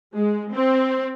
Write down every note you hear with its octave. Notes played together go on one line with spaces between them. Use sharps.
G#3
C4